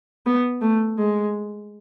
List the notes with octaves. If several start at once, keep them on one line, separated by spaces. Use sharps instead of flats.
B3
A3
G#3